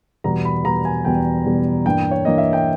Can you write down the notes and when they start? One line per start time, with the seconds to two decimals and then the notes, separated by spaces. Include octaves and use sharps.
0.24 E2 B2 G3 B3 A#5
0.45 B5
0.64 E2 B2 G3 B3 A#5
0.85 G#5
1.05 E2 B2 G3 B3 G5
1.46 E2 B2 G3 B3
1.86 G2 E3 A#3 G5
2.11 C#5
2.25 G2 E3 A#3 D#5
2.38 E5
2.53 G5